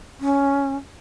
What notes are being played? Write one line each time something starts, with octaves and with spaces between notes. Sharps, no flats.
C#4